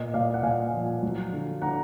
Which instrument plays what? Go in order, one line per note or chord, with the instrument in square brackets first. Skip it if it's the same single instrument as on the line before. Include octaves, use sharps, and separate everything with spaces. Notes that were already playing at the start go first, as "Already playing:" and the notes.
Already playing: [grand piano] A#2 D#5
A#2 D5 F5
F#5
A#2 F5 G#5
F3
F#3
D3
D3 F#5 A#5